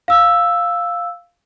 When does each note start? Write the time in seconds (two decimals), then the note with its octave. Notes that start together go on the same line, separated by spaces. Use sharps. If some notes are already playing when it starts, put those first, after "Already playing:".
0.08 F5 E6